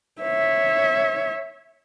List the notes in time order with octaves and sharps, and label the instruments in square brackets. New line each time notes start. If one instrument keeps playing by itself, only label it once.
[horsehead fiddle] C#5 E5